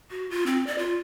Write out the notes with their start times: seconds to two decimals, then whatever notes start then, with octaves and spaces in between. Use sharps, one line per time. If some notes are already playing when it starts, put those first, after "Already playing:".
0.11 F#4
0.30 F4
0.46 C4
0.67 D5
0.78 F4